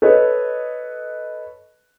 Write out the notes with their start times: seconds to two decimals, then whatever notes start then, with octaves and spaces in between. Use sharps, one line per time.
0.02 A4 B4 C#5 D#5